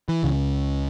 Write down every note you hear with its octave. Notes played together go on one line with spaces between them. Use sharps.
E3
C#2 C#3